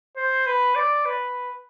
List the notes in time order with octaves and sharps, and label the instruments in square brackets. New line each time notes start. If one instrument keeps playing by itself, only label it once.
[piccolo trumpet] C5
B4
D5
B4